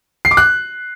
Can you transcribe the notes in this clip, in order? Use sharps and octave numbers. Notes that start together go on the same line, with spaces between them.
C7
D6
F#6